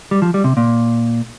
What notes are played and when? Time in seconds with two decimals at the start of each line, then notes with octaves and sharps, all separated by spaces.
0.11 G3
0.22 F3
0.34 G3
0.44 C3
0.57 A#2